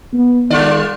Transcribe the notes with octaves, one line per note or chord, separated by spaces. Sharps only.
B3
D#3 G3 F4 D5